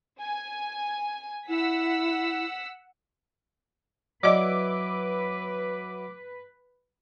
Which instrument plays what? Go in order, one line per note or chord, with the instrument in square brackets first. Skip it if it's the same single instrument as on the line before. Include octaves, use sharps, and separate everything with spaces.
[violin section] G#5
[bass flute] E4 [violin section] F#5 E6 B6
[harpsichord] F#3 E4 [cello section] B4 [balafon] D5 D#5 [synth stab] D6